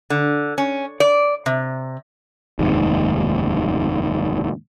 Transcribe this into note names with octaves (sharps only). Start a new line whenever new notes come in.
D3
C#4
D5
C3
F1 D#2 G#2